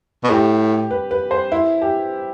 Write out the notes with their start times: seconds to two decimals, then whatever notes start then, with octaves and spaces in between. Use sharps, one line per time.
0.24 B2
0.30 A2 G4
0.91 B4
1.11 B4
1.31 C5
1.52 E4
1.82 G4